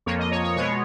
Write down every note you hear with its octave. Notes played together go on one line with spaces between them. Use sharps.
F2 F3 A#3 C#5
D#5
C#5
C#5
B2 G#3 B3 C#5